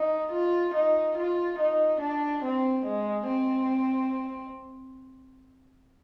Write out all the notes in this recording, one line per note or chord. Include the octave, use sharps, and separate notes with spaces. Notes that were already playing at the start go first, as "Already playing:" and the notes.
Already playing: D#4
F4
D#4
F4
D#4
D4
C4
G#3
C4